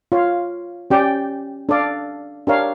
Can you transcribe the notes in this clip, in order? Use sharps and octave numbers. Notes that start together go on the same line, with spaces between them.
F4 C#5 F5
C#4 G4 D5 G5
D4 A4 D5 F5
D4 G4 A#4 C#5 F5